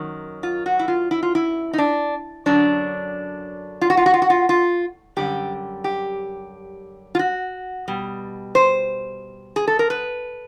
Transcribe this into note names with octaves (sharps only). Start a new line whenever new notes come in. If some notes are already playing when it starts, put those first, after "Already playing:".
Already playing: F#2 D#3 F#3
F4
F#4
E4
F4
E4
F4
E4
D#4
D4
F#2 D3 F#3 D4
F4
F#4
F4
F#4
F4
F#4
F4
F4
F#2 D3 G3 G4
G4
F4
F#4
B2 G3
C5
G#4
A4
A#4
B4